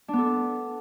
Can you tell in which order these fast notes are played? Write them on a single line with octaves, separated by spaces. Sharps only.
D4 B3 A4